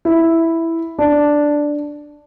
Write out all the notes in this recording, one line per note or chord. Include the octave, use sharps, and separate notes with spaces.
E4
D4